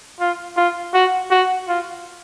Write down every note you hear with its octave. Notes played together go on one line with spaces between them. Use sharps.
F4
F4
F#4
F#4
F4